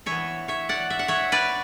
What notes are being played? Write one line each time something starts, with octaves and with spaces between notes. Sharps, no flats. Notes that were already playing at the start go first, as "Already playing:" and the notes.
E3 B3 C#5 E5
C#5 E5
D5 F#5
E5
F#5
C#5 E5
B4 D5